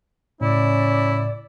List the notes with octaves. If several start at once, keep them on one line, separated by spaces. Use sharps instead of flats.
A2 C#3 C#4 E4 D5